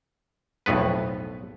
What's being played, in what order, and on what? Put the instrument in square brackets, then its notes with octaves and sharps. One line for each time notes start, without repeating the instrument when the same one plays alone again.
[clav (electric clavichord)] B1 F2 A2 B3 B4